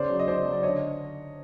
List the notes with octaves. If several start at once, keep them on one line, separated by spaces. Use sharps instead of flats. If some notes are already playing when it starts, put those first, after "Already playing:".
Already playing: C#3 C5 D5
F#3
D#5
C#3 C5 D5
F#3
D5
D3 C#5 D#5